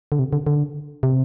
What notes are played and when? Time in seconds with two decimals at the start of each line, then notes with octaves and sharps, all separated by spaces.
0.12 D3
0.19 C3
0.33 D3
0.47 D3
1.03 C3